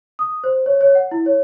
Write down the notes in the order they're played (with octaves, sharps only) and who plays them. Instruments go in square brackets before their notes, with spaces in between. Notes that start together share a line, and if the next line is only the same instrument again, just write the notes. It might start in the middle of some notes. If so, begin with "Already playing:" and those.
[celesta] D#6
C5
C#5
C#5
F#5
E4
C#5